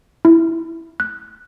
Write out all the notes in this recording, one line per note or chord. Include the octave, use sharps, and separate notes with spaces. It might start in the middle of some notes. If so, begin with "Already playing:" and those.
E4
F#6